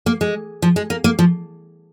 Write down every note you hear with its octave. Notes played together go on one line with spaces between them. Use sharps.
A#3
G#3
F3
G#3
A#3
A#3
F3